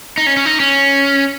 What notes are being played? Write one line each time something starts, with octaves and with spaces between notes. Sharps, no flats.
D#4
C#4
C#4
D#4
C#4